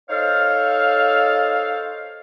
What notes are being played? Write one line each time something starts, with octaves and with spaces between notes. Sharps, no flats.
D#4 A4 C5 C#5 F5